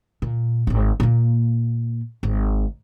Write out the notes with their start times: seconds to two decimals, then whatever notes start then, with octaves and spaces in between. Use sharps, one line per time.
0.22 A#2
0.67 D1 G#1
1.00 A#2 A#3
2.23 G#1